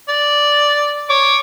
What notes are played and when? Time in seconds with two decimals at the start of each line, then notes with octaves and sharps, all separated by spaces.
0.09 D5
1.10 C#5 D6